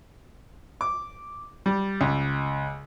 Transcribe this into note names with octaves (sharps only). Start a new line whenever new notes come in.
D6
G3
C#2